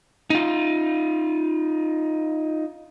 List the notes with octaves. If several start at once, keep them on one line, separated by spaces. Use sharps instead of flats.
D#4 F4